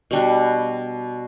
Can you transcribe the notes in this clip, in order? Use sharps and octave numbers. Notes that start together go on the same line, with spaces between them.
B2 G3 D4 F#4